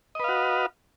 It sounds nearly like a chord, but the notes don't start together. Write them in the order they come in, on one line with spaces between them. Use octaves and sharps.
D#5 B4 F5 F#4